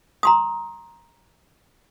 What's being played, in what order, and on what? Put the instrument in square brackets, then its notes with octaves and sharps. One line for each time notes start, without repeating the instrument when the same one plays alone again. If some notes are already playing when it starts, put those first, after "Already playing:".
[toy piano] A#5 C6 D#6